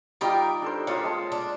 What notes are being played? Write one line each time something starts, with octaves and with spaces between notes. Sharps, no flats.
G3 D#4 F4 G4 A#4 G5
D4 A4 C5
A#3 C#4 F4 D#6
G#3 A5
D4